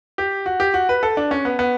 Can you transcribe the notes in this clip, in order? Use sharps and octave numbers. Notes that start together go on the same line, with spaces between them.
G4
F#4
G4
F#4
B4
A4
D4
C#4
B3
B3